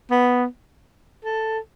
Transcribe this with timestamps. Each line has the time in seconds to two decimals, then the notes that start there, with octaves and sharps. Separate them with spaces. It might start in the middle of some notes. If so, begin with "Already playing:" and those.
0.11 B3
1.25 A4